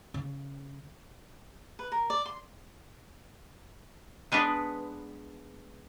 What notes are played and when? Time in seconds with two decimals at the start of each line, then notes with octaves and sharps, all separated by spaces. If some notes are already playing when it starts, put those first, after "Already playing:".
0.14 C#3
1.79 B4
1.92 A#4
2.10 D5
2.26 C6
4.32 G#3 B3 D4 B4